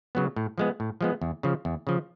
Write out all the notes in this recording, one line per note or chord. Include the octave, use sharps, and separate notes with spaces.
C#3 F#3 B3
A2
F3 G#3 B3
A2
F3 G#3 B3
E2
C#3 F3
E2
C#3 F3